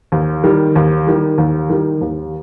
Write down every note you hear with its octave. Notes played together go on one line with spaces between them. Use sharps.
D#2
D#3 G3
D#2
D#3 G3
D#2
D#3 G3
D#2